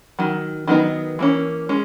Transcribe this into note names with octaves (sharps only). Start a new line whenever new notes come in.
D#3 F#3
D#3 F#3 B3 D#4
E3 A#3 C#4
G#3 C#4